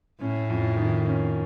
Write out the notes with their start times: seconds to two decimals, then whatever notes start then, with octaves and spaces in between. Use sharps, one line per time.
0.21 A2 C#4
0.50 F2
0.77 D#3
1.06 C#4